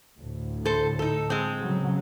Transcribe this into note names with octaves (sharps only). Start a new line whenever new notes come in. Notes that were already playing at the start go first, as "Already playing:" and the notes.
D2 A2
A4 C5
D#4 A4
G#3 C4
C#3 F#3